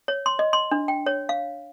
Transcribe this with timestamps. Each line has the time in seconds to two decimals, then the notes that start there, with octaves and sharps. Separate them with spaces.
0.08 C#5
0.26 C6
0.39 D#5
0.53 C6
0.71 D4
0.88 G5
1.06 C#5
1.29 F5